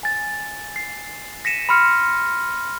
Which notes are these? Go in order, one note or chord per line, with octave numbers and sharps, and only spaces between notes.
G#5 A6
C7
A#6 B6 C#7 D#7 E7
B5 C6 F6 C#7